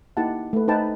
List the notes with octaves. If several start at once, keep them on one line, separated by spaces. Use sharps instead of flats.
A#3 D#4 E4 G4 F#5 A5
A3 B4
D#4 B4 C5 G5 A5